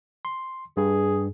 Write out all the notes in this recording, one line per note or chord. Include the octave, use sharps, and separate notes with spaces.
C6
G2 G#4